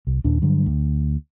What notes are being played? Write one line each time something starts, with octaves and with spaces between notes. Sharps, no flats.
C2
D#2 A#2 D4
G2 D3 F#3
D2